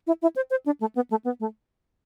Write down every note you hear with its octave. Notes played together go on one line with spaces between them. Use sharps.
E4
E4
C5
C5
D4
A3
B3
A3
B3
A3